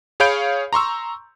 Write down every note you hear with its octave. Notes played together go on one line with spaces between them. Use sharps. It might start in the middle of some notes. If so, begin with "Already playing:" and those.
G#4 C#5 F5 B5 G6 D7
A#5 C6 C#6 E6